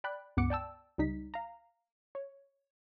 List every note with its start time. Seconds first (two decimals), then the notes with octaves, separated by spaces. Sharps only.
0.04 D5 G5 B5 F#6
0.37 C#2 G2 B3 F#5 D6 C#7
0.50 D5 G5 A5 E6
0.98 C#2 G3 D#4 B6
1.34 F5 A#5
2.15 C#5